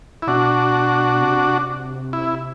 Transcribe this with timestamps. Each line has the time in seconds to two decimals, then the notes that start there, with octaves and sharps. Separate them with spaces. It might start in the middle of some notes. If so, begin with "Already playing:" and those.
0.22 E4
0.27 B2 D4 F#4
1.21 C3
2.13 E4